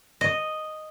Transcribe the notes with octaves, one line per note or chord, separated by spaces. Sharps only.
D#5